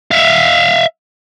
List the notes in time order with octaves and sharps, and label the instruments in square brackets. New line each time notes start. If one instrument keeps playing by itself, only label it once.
[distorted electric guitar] E5 F5